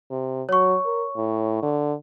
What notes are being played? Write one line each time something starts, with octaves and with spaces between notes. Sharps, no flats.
C3
F#3 C#5 C#6
A#4
A2
D3